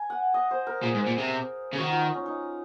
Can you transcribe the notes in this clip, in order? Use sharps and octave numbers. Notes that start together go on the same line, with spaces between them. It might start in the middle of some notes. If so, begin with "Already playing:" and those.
Already playing: G#5
F#5
D#5
C5
A#4
A#2 G#4
G#2
A#2
C3
C#3
D#3 F#4
F4
D#4
C#4
D#4